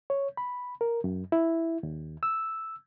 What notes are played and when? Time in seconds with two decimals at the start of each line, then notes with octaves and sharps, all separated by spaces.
0.10 C#5
0.37 B5
0.81 A#4
1.04 F#2
1.32 E4
1.83 D#2
2.23 E6